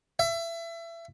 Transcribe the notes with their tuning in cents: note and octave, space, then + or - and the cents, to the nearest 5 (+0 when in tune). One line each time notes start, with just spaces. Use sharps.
E5 +25